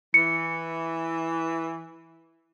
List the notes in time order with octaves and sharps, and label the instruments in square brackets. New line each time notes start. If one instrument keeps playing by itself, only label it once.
[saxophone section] E3 [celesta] C#7